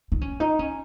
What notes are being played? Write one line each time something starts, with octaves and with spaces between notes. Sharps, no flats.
D#4
C#4
D#4
C#4